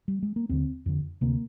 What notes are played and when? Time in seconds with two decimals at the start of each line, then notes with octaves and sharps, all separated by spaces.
0.08 G3
0.23 G#3
0.36 A#3
0.49 D#2 D3 C4
0.86 F2 D3
1.21 D2 C3 A#3